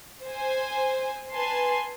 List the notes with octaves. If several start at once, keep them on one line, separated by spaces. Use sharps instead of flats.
C5 G#5
B4 G#5 A5 C6